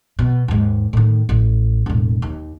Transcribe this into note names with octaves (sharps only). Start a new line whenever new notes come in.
B2
D#2 G#2
A2 D#3
A1
E1 A1
D#2